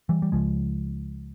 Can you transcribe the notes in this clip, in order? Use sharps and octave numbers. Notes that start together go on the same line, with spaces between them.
E3 G3
G3
C#2 C#3 F3 G#3